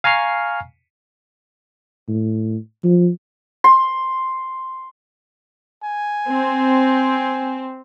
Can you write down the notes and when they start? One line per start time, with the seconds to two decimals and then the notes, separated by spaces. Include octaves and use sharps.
0.04 F5 G#5 A#5 C#6 F6 C7
2.08 A2
2.84 F3
3.64 C6
5.84 G#5
6.28 C4